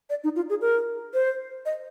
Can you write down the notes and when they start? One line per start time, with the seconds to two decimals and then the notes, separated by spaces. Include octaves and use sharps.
0.10 D5
0.24 D#4
0.36 F4
0.50 G#4
0.61 A#4
1.14 C5
1.66 D#5